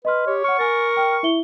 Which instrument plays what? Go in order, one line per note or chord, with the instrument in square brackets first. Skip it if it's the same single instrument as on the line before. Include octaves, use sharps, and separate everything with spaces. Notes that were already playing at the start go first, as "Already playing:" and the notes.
[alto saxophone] B4 [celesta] D#5 C6 F6
[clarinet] G4 [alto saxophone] C#5
[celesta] F#5 F6 [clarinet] C#6
[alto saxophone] A#4 [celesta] G#5 A6
[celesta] G5 F6
E4 E5 G7